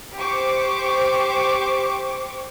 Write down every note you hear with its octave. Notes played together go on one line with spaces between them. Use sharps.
G4 C5 C#6 D6